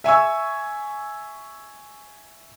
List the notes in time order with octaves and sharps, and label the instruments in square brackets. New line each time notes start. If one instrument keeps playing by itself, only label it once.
[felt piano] E5 G#5 C#6 E6